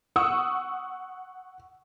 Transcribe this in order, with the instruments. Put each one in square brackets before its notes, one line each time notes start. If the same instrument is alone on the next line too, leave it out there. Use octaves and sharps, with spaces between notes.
[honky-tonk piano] F#5 C#6 D#6 E6